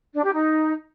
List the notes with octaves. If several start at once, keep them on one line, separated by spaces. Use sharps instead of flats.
D4
G4
D#4